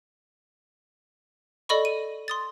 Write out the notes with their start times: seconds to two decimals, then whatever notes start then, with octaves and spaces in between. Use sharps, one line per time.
1.69 A4 D5 D#5 B5 C#6
1.85 D#7
2.28 C6 D#6 A6